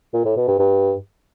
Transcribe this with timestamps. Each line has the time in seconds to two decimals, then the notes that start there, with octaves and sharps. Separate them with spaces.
0.14 A#2
0.25 A2
0.37 B2
0.48 G2
0.59 G2